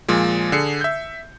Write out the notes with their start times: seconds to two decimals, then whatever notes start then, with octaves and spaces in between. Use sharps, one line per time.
0.08 A#2 F3 G#3
0.52 D3 G#4 C7 C#7
0.81 E5 G6